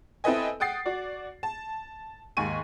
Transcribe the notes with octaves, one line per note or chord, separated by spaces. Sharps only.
C4 E4 A4 B4 D#5 G#5
F#5 G5 D#6 A6 C7
F#4 D5
A5
D#2 G#2 G#5 C#6 D#7